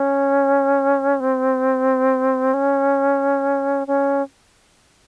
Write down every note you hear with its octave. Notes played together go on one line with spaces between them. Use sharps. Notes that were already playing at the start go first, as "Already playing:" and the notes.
Already playing: C#4
C4
C#4
C#4